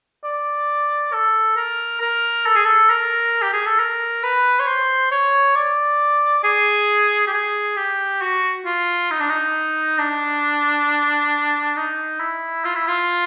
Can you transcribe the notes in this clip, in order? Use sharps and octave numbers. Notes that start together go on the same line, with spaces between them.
D5
A4
A#4
A#4
A4
G#4
A4
A#4
G4
G#4
A4
A#4
B4
C#5
C5
C#5
D5
G#4
G4
G#4
G4
F#4
F4
D#4
D4
D#4
D4
D#4
E4
F4
E4
F4